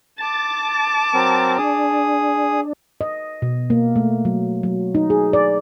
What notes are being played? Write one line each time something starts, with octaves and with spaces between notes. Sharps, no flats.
A5 D6 A6
F#3 C4 A#4
D4 G#4 D#6
D#5
B2
A#3
A3
F#3
F#3
D#4
G#4
D5